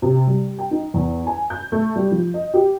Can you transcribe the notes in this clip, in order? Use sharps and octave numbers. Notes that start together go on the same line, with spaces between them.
C3
G3
G5
D#4
E2
G#5
G6
A3
G3
F3
D#5
G4